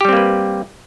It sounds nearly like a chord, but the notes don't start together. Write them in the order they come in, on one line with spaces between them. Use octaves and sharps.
G4 G3 C4 A#3 B4